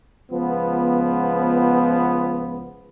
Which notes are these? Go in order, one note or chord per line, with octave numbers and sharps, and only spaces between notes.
C#2 F3 B3